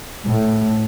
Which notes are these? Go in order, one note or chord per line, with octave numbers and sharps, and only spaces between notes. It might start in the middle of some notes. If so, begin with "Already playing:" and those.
A2